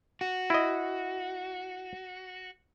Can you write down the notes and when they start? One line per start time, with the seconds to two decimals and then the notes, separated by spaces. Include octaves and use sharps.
0.21 F#4
0.50 E4 D#5